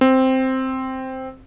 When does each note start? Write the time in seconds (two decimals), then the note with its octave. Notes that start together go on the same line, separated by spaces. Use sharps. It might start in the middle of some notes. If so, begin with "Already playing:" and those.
0.01 C4